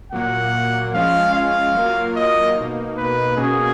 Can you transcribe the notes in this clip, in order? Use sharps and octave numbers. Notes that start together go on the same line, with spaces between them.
A#2 F#3 A#3 F#5
F3 G#3 C#4 F4 F5
F5
F#3 A#3 F4 A#4
D#5
B2 A#3 D#4
B4
B2 A#3 C#4 F#4 G#4